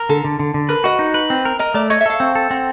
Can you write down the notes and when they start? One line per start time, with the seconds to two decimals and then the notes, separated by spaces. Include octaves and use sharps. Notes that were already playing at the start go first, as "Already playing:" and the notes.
Already playing: A#4
0.09 D3 A4
0.25 D3
0.39 D3
0.54 D3
0.69 A#4 B4
0.84 F#4 D#5
0.99 D#4
1.14 B4
1.30 C4
1.45 A#4
1.59 A#4 D#5
1.74 A3 D5
1.90 C#5 D#5
2.01 E5
2.06 A4 F5
2.20 C4
2.35 A4
2.50 C4 F#5